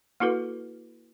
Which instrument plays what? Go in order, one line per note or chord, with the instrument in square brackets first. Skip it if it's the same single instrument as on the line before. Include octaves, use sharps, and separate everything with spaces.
[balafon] A#3 E4 F#4 A4 B4